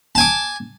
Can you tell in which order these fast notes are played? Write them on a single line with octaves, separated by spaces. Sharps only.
A5 G#5 D6